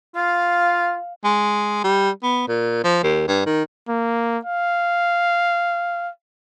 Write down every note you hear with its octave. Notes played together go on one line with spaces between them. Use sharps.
F4 F5
G#3
G3
B3
A#2
F3
D#2
G2
D#3
A#3
F5